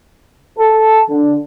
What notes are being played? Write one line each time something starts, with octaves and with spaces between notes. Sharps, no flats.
A4
D3